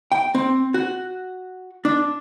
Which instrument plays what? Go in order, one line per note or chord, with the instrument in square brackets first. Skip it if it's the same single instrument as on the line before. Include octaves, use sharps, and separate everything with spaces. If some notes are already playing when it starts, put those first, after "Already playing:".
[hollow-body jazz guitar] G5
C4
F#4
D4